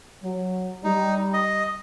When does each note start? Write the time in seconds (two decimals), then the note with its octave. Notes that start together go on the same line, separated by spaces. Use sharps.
0.24 F#3
0.84 G3 D#4
1.33 D#5